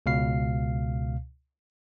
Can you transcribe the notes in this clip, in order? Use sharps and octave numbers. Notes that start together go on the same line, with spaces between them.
C#2 B2 F5 C7